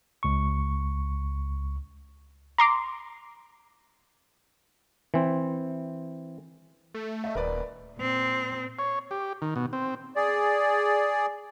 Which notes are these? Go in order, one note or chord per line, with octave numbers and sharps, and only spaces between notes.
C#2 C#6
A#5 C6 D6
E3 C4
A3
D#5 E5
D#1 A#4 B4 D5
A#2 C4
C#5
G4
D#3
B2
C4
G#4 D5